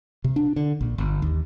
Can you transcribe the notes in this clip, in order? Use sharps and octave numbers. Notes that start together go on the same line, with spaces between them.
C3
D4
D3
A#1
G1
D#2